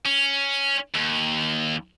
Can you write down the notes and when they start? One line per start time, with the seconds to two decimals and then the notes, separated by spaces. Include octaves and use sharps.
0.06 C#4
0.95 D#2